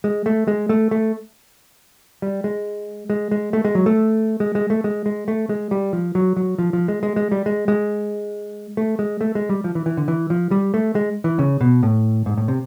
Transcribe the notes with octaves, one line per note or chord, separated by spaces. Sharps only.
G#3
A3
G#3
A3
A3
G3
G#3
G#3
G#3
A3
G#3
F#3
A3
G#3
G#3
A3
G#3
G#3
A3
G#3
G3
F3
F#3
F#3
F3
F3
G#3
G#3
G#3
G3
G#3
G#3
A3
G#3
A3
G#3
G3
F3
E3
E3
D3
E3
F3
G3
A3
G#3
E3
C#3
B2
A2
G#2
A2
C3